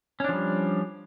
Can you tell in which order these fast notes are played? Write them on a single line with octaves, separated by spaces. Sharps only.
C#4 D4 F3 G3